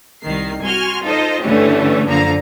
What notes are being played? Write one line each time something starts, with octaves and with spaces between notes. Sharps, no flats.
C2 D#3 C7
F#4 G#5 C6 F6
D#4 F4 A4 C5 D#5
G2 D3 E3 A3 C#4 G4
F#2 D3 F3 A#3 F5 A#5